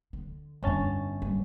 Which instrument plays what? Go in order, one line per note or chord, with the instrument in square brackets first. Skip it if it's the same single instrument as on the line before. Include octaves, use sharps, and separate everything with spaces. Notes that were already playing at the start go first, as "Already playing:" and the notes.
[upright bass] D3
[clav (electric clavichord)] G1 C#4 A5 [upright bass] F2 D4
[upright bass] G3